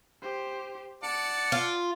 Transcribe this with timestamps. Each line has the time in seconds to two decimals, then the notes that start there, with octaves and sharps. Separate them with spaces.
0.23 G4 C5
1.03 D5 F#5 A5 C#7
1.52 F4